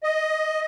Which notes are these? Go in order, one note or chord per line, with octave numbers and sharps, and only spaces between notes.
D#5